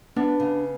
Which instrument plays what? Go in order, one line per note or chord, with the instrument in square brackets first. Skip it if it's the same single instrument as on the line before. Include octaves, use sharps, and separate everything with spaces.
[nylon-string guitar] B3 [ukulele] D4
[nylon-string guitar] C#3